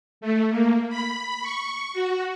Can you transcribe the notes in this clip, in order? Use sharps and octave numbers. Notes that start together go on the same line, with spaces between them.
A3
A#3
B5
C#6
F#4